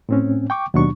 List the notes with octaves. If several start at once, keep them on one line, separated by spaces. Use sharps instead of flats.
A2 C4 C#4
G5 C#6 D6
D#2 B2 F#3 D4 C#6